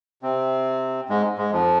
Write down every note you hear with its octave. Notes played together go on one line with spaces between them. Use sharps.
C3 C4
G#2 G#3
G#2 G#3
F2 F3